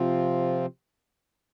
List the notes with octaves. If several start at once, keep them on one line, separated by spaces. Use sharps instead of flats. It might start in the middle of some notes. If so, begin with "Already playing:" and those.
Already playing: C3 F3 C4 F4